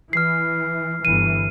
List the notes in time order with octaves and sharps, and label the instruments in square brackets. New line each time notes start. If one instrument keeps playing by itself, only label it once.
[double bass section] E3 [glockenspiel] F6 C7
[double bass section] G1 E3 [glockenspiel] D#7